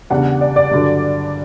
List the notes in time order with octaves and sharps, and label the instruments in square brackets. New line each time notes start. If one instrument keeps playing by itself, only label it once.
[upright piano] E2 C#3 G3 D4 [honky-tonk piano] F#5
[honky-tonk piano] D5
D5
[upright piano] G2 D3 F#3